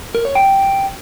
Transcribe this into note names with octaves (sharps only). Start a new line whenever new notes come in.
A#4
C#5
G5